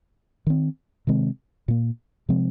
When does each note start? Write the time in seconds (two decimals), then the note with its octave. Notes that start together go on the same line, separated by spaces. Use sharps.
0.47 D#3 C4
1.07 C3 D#3 G#3 C4
1.68 A#2 A#3
2.29 C3 F3 G#3 C4